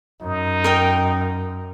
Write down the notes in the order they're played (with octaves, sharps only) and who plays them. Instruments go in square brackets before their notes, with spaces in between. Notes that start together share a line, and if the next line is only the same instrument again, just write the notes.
[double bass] F#2 [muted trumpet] D#4
[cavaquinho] A#4 D#5 G5